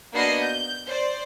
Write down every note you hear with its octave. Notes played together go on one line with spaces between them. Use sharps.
A#3 B3 D4 F#4 D#5 C7
G6
C5 D5